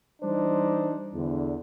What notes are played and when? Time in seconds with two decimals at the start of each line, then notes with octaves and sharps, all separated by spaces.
0.22 E3 G3 D4 D#4 C5
1.14 E2 D3